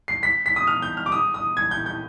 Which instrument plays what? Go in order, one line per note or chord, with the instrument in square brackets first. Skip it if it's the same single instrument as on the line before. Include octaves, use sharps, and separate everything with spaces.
[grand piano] C7
B6
B6
D#6
F6
G6
F6
D6
D#6
D#6
G#6
G6
G6